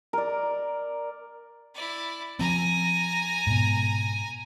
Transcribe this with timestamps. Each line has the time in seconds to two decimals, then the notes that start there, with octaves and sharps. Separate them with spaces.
0.13 A#4 D5
1.75 E4 D5
2.39 F3 C4 G#5 A#5
3.47 G#2 B2